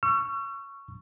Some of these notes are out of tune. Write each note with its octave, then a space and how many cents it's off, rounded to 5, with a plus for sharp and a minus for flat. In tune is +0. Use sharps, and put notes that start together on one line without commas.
C#6 +0 E6 +45